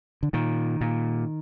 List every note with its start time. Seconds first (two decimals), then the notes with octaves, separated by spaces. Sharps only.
0.23 D3
0.33 A#2 D#3
0.81 A#2